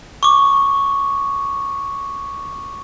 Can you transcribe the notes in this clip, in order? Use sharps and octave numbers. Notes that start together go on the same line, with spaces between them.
C#6 D6